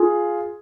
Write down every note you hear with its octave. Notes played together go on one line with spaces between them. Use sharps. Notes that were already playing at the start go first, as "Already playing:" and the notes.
Already playing: F4 G#4